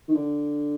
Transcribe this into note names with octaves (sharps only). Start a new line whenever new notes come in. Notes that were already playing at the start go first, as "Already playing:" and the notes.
D#3
D3